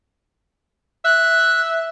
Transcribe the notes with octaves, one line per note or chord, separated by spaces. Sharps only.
E5 F#6